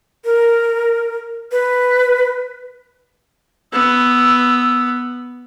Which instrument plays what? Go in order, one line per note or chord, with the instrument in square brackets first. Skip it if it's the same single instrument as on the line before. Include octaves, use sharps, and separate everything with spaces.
[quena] A#4
B4
[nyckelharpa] B3 [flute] E6